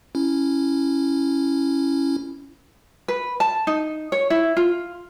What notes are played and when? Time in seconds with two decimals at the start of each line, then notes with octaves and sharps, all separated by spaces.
0.15 C#4 E4
3.08 B4
3.40 A5
3.67 D#4
4.12 C#5
4.30 E4
4.57 F4